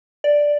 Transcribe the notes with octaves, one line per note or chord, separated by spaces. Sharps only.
D5